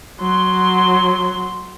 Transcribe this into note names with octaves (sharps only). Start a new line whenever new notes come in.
F#3 C6